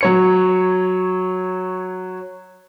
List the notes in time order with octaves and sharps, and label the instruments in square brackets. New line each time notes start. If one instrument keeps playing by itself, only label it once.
[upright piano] F#3 C#5 C#7